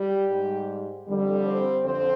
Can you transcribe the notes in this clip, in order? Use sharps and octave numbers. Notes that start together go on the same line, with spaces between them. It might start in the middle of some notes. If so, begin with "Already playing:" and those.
Already playing: G3 G4
G#2 G3
F2 D3 G3
C4 C5
F2 D3 F3 C4 C5